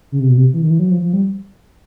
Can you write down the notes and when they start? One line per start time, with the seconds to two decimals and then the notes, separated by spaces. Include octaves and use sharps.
0.12 C#3
0.20 C3
0.29 B2
0.37 C3
0.53 E3
0.63 D#3
0.70 E3
0.79 F#3
0.91 F3
1.02 F3
1.13 G3